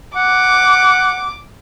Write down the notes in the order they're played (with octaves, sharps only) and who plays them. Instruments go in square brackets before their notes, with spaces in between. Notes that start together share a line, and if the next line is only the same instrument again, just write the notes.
[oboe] F#5 [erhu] D6